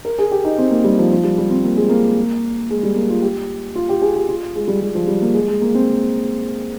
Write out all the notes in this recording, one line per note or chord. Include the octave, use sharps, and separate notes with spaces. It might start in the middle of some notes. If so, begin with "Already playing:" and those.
A#4
G#4
G4
D#4
C4
A#3
G3
F3
F3
G3
G3
C4
A#3
G#3
A#3
G#3
G3
A#3
F4
G4
F4
G4
G#4
G4
F4
G#3
G3
G3
F3
G3
A#3
G#3
G#3
A#3
C4